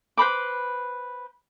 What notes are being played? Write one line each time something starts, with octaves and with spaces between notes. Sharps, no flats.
B4 C5 B5 D6